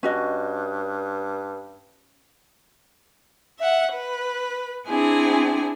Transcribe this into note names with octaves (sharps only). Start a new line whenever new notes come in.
G2 C#4 F#4 D#5
E5 F#5
B4
C4 D4 E4 G#4 G#5